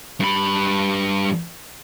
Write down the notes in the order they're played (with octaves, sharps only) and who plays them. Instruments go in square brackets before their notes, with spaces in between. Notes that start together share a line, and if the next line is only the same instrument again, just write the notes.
[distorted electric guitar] G2 B5